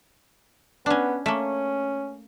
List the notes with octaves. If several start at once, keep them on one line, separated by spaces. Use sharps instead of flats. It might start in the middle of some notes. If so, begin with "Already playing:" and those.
B3 C#4 D4
A3 A#3 C#4